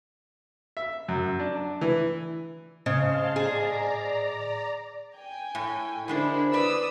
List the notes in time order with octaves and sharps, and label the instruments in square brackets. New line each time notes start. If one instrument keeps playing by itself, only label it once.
[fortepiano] E5
F#2
D4
E3
[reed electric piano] A2 C5 D#5 [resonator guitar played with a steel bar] C#3 [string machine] F5 A5 C6
[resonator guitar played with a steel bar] G#4 [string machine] D5 A#5
[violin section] G5 G#5
[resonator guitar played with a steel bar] A2
[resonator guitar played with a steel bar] D3 G#3 D4 [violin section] E4 A#4 C5
[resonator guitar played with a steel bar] B4 D5 [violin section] D#6 E6